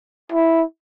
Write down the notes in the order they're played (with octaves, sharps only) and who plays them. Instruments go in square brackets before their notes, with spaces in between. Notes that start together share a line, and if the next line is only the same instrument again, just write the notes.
[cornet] E4